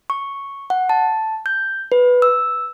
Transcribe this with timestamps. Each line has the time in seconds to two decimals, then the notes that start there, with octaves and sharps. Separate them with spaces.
0.10 C#6
0.70 F#5
0.89 A5
1.46 G6
1.92 B4
2.22 E6